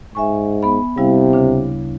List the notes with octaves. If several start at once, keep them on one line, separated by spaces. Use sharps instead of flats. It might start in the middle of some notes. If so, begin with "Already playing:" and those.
G#2 E5 G#5 C#6
B3 B5
C3 G3 E4 F5
D2 C#3 D4